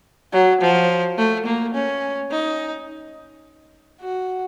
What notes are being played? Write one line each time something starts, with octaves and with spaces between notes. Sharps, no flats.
F#3
F3
A3
A#3
C#4
D#4
F#4